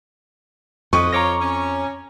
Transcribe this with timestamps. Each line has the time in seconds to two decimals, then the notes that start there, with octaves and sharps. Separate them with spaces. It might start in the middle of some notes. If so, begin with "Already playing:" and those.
0.93 F2 B4 D#5 C#6
1.13 F4 C#5 A#5 D6 A#6
1.40 C#4